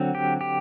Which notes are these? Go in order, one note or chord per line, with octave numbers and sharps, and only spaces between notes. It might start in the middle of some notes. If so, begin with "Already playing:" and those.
Already playing: D3 F#3 C4
G4
G4